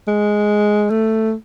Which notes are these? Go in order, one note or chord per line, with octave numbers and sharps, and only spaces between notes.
G#3
A3